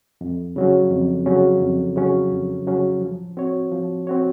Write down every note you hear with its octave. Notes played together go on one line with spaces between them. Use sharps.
F2
C#3 F#3 C#4
F2
C#3 F#3 C#4
F2
C#3 F#3 C#4
F2
C#3 F#3 C#4
F3
C4 F#4 C#5
F3
C4 F#4 C#5